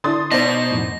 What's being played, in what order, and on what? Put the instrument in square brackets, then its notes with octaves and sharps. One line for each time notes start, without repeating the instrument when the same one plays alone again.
[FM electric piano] D3 D4 E4 [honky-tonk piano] C6 D#6 A6
[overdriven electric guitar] B2 [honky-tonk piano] D#4 C5 [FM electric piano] D5 [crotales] A#6
[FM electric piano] F2 A2